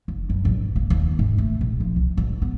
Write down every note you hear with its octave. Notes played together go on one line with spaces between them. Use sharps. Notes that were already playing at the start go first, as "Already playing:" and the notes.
F#1
F#2
A1
A#3
D#2
G#2
A3
A#1
F3
C2
A1
B3